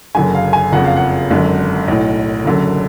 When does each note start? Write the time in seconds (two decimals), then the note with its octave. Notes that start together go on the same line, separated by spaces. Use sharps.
0.15 F#1 F#2 D3 G#5
0.35 F5
0.53 G#5
0.72 F#1 F2 C#3 F#5
0.84 F5
0.96 F#5
1.31 G#1 F#2 D3
1.88 B1 A2
2.45 F#1 F#2 D3